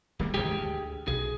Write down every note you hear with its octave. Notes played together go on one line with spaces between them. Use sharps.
D#1 G3 A#3
D#2 G#2 D3 G4 G#4 G5
D2
B1 G#4